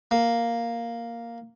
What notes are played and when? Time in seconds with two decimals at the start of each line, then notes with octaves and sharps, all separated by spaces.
0.11 A#3